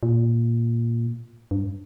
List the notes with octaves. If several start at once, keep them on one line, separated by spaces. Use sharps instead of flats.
A#2
G2